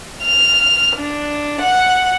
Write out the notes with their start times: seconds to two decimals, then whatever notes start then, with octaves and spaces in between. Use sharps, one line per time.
0.23 F6
0.97 D4
1.61 F#5